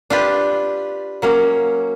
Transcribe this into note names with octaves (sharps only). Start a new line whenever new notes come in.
D4 F4 G4 B4
F#3 A#3 C#4